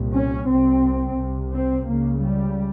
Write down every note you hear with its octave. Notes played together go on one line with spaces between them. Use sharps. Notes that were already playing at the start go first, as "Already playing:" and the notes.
Already playing: C2 A#2
C#4
C2 C3 C4
C2 C3
C4
C#2 C#3 A#3
G3